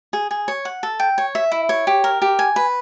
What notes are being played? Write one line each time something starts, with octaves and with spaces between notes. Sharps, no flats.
G#4
G#4
C#5
F#5
A4
G5
C#5
E5
E4
C#5
G4
A#4
G4
G#5
B4